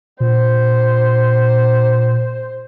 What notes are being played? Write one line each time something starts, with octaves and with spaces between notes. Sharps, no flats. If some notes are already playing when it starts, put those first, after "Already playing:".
A#2 C5